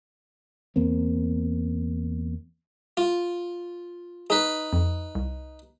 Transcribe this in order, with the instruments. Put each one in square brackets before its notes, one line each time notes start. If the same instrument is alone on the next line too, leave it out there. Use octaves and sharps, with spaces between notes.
[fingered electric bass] E2 A#3 C4
[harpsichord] F4
[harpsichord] D#4 B4 [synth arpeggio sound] G#4
[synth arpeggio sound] F2
C2